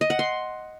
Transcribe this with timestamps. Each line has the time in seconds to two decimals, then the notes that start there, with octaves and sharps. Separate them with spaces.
0.01 D#5
0.10 F#5
0.19 C6